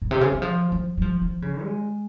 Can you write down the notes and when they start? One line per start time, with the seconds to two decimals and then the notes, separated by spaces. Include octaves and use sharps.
0.02 A#2
0.11 C3
0.21 C#3
0.32 E3
0.42 F3
0.72 F3
0.98 G3
1.02 F3
1.22 F3
1.42 C#3
1.62 G#3